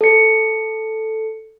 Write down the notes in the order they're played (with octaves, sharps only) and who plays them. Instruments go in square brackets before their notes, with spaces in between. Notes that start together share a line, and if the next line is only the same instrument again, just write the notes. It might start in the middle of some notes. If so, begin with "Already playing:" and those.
[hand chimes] A4 C#7